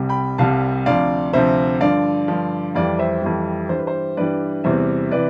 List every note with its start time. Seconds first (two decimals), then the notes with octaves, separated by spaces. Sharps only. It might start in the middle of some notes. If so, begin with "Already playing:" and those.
Already playing: C2 C3 G3
0.09 G5 B5
0.38 C2 C3 G3 F5 A5
0.86 D2 C3 F3 D5 F5
1.33 D2 C3 F3 C5 E5
1.81 G2 D3 F3 D5 F5
2.28 G2 D3 F3
2.75 F2 E3 G3 D5 F5
2.99 C5 E5
3.22 F2 E3 G3
3.69 G2 E3 G3 C5
3.79 B4
3.87 C5
4.17 G2 E3 G3 B4 D5
4.64 E2 C3 E3 G3 C5 E5
5.11 C3 E3 B4 D5